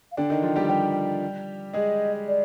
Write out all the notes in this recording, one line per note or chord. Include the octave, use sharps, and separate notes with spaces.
F5
D3 D4 G5
D#3 D#4
F3 F4
G3 G4
G3 G4
G#3 G#4 D#5
D5